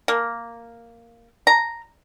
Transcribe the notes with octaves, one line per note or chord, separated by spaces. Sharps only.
A#3
A#5